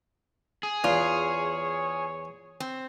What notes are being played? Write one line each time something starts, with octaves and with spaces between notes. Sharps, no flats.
G#4
E2 F4 C#5
C4